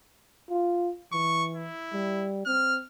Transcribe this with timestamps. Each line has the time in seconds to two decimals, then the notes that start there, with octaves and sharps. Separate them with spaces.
0.49 F4
1.12 E3 C#6
1.55 E4
1.93 G3
2.46 C4 F6